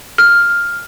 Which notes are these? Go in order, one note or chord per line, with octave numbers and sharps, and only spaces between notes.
F6